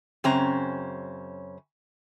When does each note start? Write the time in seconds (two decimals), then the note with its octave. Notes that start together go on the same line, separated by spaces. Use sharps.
0.24 F#2 C#3 C4 C#4 A#5